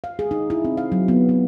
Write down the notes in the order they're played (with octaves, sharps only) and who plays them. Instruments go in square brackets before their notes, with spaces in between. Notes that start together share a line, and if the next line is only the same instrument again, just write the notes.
[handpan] F5
G#4
D#4
E4
C4
F5
F#3
B3
B3